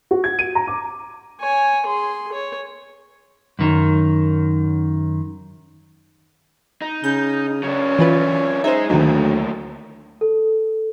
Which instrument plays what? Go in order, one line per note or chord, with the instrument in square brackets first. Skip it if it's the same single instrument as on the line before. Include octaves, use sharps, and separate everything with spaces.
[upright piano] F#4
G#6
D#7
A#5
D6
[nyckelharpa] C#5 G#5
G#4 C6
C#5
[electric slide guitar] F#2 D#3
[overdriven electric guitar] D#4
[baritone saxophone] C#3 [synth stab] G6
[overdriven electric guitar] F#3 D4 [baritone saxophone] C#4
[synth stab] E3 F4 B4
[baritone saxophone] D#4 [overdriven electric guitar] G#4 D#5 [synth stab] C5 E5
[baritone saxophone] D2 [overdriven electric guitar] A#2 A3 [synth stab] D#3 F#3
[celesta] A4